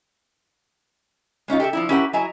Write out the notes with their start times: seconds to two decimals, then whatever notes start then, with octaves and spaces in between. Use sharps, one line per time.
1.48 G#3 C#4 D#4 F4
1.60 G4 A4 D5 E5
1.73 F3 D4 E4
1.89 C#4 E4 G4 A#4 E5 F#5
2.13 F#3 E4 D#5 G#5 A#5